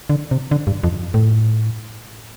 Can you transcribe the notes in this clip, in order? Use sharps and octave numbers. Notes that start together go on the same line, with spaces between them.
D3
C3
D3
G2
F2
A2